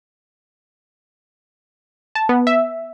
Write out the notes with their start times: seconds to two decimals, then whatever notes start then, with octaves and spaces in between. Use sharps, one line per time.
2.15 A5
2.29 B3
2.47 E5